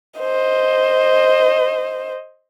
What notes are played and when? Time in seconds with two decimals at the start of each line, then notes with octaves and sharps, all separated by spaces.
0.20 C5 D#5